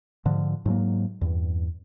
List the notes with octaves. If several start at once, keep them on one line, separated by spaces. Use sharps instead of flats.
G#2 D3 F3
G#2 F#3 A#3
E2 G2